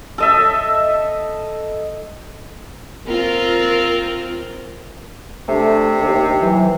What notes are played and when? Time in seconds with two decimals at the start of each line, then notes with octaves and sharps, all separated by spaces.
0.18 A4 D#5 E5
3.07 C4 F4 A#4
5.48 C3 A3 D4
6.00 D#2
6.41 E3 F#3